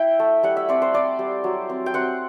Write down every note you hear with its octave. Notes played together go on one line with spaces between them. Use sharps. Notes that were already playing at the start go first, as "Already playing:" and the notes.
Already playing: E4 E5 G5
A3
G3 F#5
E5
C4 D5
C5
C4 D5
G3
F#3
C4
G5
C4 F#5